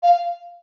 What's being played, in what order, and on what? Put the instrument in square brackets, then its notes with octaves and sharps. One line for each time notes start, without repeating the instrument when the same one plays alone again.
[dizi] F5